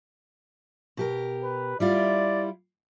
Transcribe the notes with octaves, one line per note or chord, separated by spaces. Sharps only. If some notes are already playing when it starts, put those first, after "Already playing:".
B2 G4 A#4
B4
G3 E4 F4 D5